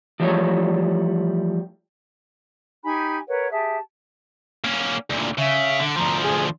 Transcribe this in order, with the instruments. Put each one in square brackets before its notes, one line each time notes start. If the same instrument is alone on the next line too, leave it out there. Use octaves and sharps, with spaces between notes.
[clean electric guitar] E3 F3 G3 A3 C#5
[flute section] D#4 G4 G#5 B5
A#4 B4 C#5 F#5
G4 G#4 E5 A5
[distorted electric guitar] A#3 C#4
D2 A#2
[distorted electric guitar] C#3 [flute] E5
[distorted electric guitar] D3
[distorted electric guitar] D2 F3 [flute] A#5
[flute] G#4